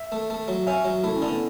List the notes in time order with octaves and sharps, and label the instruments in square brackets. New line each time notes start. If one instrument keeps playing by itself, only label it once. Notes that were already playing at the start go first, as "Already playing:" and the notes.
Already playing: [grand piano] E5
[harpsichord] A3
A3
F#3
[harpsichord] C#4 [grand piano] E5
[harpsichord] F#3
[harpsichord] A3 [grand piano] E4
[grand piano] C#4
[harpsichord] D3
[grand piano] B3